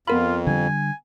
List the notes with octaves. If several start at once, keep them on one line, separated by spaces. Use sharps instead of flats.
F2 B3 F4 A#4 B5
D3 G3 G#5